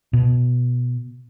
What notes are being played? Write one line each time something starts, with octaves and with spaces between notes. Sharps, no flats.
B2